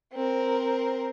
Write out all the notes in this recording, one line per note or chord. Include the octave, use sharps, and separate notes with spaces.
C4 A#4